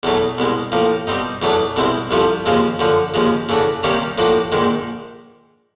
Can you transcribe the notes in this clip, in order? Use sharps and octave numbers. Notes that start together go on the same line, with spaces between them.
E2 B2 F#3 A3
C2 B2 G#3
A2 F3 A#3
B2 G3 C4 D#4
E2 B2 F#3 A3 D4
C2 B2 G#3 C4 E4
C2 C3 F3 A3
D#2 C#3 F3 G#3 C4
F#2 D3 F3
D#2 C#3 F3 G#3
C#3 E3 A3 D4 F#4
C3 D#3 G3 A#3 C#4
A2 F3 A#3 D4 F#4
A#1 G#2 D#3 G#3